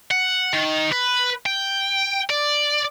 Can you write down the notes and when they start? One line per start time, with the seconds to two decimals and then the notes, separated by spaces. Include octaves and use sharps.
0.11 F#5
0.54 D#3
0.92 B4
1.46 G5
2.30 D5